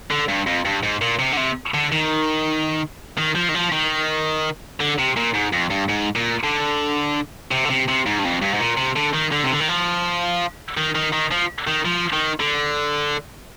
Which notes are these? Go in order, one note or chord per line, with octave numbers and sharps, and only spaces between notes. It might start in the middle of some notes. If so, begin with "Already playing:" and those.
D3
G2
F2
G2
G#2
A#2
C3
D3
C3
D3
D#3
D#3
F3
D#3
F3
D#3
D3
C3
A#2
G#2
F2
G2
G#2
A#2
D3
C3
D3
C3
C3
G#2
G2
F2
G2
G#2
A#2
C3
D3
D#3
D3
C3
D3
D#3
F3
D#3
D#3
D#3
F3
D#3
F3
D#3
D3